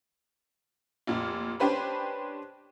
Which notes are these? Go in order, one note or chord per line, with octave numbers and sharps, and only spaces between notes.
F1 A#2
C#4 D4 G4 B4 C5 B5